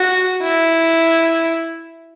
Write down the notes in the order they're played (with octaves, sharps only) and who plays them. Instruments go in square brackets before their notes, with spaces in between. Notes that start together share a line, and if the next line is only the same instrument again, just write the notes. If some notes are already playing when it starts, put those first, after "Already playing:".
Already playing: [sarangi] F#4
E4